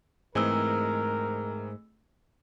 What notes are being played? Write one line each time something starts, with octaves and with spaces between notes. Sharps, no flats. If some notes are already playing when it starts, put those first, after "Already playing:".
G#2 E3 A3 C4 G#4 A#4 E6